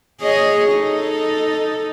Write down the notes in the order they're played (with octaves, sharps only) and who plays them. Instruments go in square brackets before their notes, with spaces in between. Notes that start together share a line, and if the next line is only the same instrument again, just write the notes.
[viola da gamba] G#4 C#5 D#5
D#4 A4